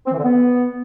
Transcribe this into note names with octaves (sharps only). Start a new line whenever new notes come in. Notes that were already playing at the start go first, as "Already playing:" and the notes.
C4
E3
D3
B3